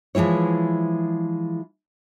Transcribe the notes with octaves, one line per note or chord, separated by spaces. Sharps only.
E3 F3 G#3 E4 C#5